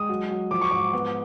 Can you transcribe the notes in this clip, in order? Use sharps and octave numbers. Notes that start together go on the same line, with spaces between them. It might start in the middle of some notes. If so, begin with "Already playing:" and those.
Already playing: G#3 D#6
F#3
F#3
F3 D6
C#6
G#2 D6
B3